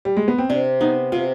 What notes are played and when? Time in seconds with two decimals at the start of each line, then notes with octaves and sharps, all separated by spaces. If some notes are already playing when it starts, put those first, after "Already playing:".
0.05 G3
0.17 G#3
0.28 B3
0.38 C4
0.49 C3 D4
0.81 B3 D#4
1.12 C3 F4